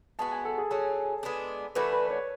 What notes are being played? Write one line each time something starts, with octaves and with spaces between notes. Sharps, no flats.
G#3 B3 F#4 A5
G#5
A4
G#4
F#3 C#4 G#4 A4
G#3 B3 D4
E3 A3 D4 F#4 B4
B4
B4
C#5